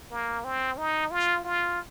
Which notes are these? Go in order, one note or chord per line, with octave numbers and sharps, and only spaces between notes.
A#3
C4
D#4
F4
F4